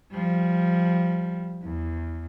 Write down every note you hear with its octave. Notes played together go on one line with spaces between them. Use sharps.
F3 G3
E2